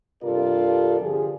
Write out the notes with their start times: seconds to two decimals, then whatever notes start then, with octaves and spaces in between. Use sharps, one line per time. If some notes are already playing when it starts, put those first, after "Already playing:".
0.23 G2 C3 F4 A4 A#4 D5
1.00 D3 F3 G4 G#4